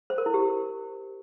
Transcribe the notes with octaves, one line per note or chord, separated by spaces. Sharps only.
C5
A#4
E4
G4